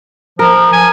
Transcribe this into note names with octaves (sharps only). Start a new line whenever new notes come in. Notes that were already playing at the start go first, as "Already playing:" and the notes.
F3 A#4
G#5